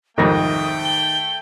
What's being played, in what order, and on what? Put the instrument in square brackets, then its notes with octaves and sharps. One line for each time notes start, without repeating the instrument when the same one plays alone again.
[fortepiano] C2 F2 G#2 [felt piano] D#3 A#6 [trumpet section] A3 G5 [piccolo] D#6
[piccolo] G7